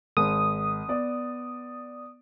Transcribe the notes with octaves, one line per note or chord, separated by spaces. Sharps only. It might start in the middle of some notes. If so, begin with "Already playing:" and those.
G#1 D#6
B3 D5